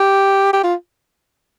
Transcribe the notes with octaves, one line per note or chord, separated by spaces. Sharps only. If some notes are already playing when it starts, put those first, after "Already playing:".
Already playing: G4
G4
F4